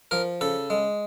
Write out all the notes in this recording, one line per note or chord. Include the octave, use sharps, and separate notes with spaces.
F3 A#4
C#3 A4
G#3